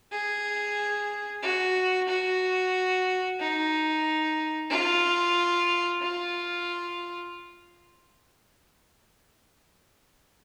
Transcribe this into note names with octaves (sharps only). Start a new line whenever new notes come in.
G#4
F#4
F#4
D#4
F4
F4